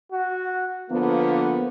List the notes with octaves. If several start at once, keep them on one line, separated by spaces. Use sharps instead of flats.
F#4
D3 F3 A#3 B3